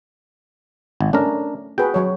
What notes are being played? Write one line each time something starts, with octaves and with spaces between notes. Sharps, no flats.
G#1
A3 C#4 D4 A#4
F#4 G#4 B4 G5
F#3 C#5